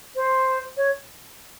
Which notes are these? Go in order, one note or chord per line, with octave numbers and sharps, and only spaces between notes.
C5
C#5